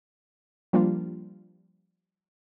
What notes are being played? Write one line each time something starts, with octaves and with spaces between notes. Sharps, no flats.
F3 G3 A#3 D4 F4